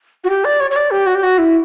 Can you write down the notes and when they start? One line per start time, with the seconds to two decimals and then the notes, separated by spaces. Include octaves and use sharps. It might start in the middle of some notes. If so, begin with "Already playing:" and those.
0.24 F#4
0.29 G4
0.44 D5
0.60 C#5
0.70 C#5
0.76 D5
0.91 G4
1.06 F#4
1.15 G4
1.23 F#4
1.38 E4